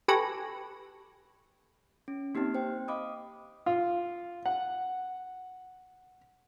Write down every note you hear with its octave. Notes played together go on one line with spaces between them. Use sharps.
G4 A4 B4 G#5 C#6 A#6
C#4
A#3 C4 D#4 G4 F6
C5 G5
D#5 F5 B5 D6 D#6
F4
F#5